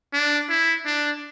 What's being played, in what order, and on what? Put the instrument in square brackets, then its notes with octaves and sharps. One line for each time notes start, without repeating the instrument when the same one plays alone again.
[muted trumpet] D4
E4
D4